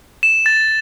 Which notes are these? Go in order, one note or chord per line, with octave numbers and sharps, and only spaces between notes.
E7
A6